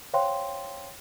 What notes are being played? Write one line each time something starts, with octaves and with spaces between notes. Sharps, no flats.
C5 C#5 F5 G5 C6